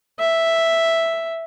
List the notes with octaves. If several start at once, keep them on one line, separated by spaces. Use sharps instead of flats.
E5